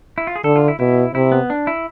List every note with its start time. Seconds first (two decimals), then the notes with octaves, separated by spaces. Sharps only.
0.18 E4
0.27 F4
0.36 G#4
0.44 D3 A4
0.56 F4
0.68 E4
0.80 B2 E4
1.15 C3 E4
1.32 B3
1.50 D4
1.67 E4